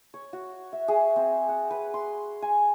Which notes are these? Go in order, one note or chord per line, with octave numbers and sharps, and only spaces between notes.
C#5
F#4
E5
G#4
C4
F#5
B4
C6
G#5